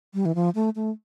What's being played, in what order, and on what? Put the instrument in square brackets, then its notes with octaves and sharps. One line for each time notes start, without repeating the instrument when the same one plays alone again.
[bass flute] G3
E3
F3
A3
A3